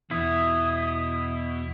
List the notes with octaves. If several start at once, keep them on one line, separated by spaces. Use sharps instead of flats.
E2 B2 E4 D#6